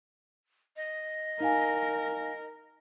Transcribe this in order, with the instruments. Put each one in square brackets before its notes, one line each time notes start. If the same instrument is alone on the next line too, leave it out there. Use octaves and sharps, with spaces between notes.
[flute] D#5
[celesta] D#4 F5 G#5 [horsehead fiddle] A#4